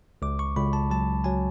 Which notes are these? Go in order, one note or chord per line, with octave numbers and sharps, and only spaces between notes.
C#2 D6
C#6
C#2 B5
A5
F#3 A5
F#3 G#5